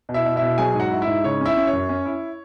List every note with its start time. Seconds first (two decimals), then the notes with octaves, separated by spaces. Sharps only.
0.09 B2
0.14 E4 E5
0.26 B2
0.36 E4 E5
0.42 B2
0.58 F#3 G#4 G#5
0.75 G#2 F#4 F#5
0.91 E4
1.02 E4 E5
1.07 G#2
1.24 C#3 C#5
1.41 C#4 E4 E5
1.56 C#4
1.67 C#5
1.73 F#2
1.89 C#4
2.05 E4